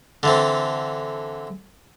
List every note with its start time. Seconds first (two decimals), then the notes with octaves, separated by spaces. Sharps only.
0.23 D3 E3 C4